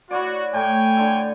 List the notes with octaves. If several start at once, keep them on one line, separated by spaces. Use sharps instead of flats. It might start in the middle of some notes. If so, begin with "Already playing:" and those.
E4 F#4 C#5 D5
A2 A3 C#5 G5 G#5
D3 A4